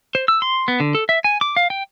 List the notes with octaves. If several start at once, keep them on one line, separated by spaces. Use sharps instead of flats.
C5
E6
C6
B3
D3
A4
E5
G#5
D6
F5
G5